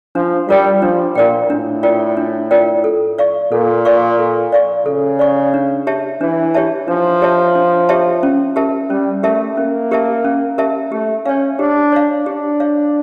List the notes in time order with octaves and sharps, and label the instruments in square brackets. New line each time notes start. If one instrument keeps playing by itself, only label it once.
[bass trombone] F3 [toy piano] D4
[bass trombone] G3 [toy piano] F4 A#4 D5 G5
[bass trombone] F3 [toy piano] D4
[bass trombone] A#2 [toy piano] F4 A#4 D5 G5
[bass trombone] A2 [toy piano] D4
[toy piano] F4 A#4 D5 G5
D4
F4 A#4 D5 G5
A4
D5 F5 C#6
[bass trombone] A#2 [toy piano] A4
[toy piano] D5 F5 C#6
A4
D5 F5 C#6
[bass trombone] C#3 [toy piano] A4
[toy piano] D5 F5 C#6
D4
G4 C#5 E5 A5
[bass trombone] E3 [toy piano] D4
[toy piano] G4 C#5 E5 A5
[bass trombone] F3 [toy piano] D4
[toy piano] G4 C#5 E5 A5
D4
G4 C#5 E5 A5
C#4
G4 A#4 E5 A5
[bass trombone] G3 [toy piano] C#4
[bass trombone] A3 [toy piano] G4 A#4 E5 A5
[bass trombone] A#3 [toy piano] C#4
[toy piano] G4 A#4 E5 A5
C#4
G4 A#4 E5 A5
[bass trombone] A3 [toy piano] G4
[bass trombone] C#4 [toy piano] C#5 F5
[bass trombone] D4 [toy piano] G4
[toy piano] C#5 F5
[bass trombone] D4 [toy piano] G4
[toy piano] C#5 F5